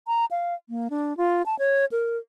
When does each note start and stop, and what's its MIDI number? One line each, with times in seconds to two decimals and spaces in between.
0.07 0.25 82
0.31 0.54 77
0.69 0.88 58
0.90 1.16 62
1.17 1.42 65
1.46 1.55 81
1.59 1.85 73
1.92 2.17 70